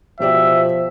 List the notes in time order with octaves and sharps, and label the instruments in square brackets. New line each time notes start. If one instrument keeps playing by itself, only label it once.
[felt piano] B2 G4 D5 [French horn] F3 [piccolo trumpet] E5